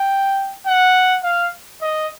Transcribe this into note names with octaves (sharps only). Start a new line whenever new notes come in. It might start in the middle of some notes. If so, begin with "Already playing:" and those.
Already playing: G5
F#5
F5
D#5